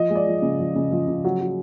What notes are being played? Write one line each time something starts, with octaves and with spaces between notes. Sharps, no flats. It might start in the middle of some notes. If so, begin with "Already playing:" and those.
Already playing: F3 D#5
G#3
D5
F3
C#3
F3
C#3
F3
C#3
F#3
F#3